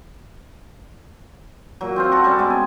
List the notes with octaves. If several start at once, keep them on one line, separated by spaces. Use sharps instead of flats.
A#2 F#3
C4 F4 C5
F#4 A4
G3 C#4 A4
G#3 B3 C4
G#5